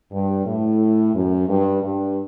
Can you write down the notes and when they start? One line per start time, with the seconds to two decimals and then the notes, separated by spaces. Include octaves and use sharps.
0.12 G2
0.46 A2
1.14 F#2
1.48 G2
1.82 G2